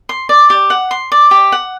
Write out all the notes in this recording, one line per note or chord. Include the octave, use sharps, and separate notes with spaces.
C6
D5
G4
F#5
C6
D5
G4
F#5